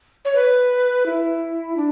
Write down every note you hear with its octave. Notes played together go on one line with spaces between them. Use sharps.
C#5
B4
E4
D4